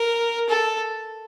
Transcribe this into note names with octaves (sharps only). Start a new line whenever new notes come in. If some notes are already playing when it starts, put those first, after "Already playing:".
Already playing: A#4
A4